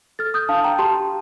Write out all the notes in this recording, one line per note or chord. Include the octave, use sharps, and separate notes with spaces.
A4 F6 A6
D#6 G6
D4 F5 A5
G5 A#5
G4 A5 C6